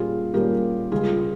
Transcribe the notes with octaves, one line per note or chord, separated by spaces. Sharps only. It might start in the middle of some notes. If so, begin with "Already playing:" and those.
Already playing: A#2 G3 A#3 C#4 F4 G#4
A#2 G3 A#3 C#4 G4 A#4
C#2 C#3 G3 F4 G#4